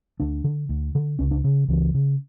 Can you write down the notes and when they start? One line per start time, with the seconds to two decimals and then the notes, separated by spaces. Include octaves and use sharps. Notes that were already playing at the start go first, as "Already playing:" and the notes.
0.20 D2 D4
0.44 D3
0.69 D2
0.95 D3
1.19 C#2 C#4
1.31 D4
1.44 C#3
1.68 C#2 E3
1.94 C#3